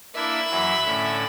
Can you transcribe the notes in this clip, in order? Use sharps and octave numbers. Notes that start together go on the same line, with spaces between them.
A#3 D4 E4 E5 B5
F#2 E3 F#3
A2 D3 C#4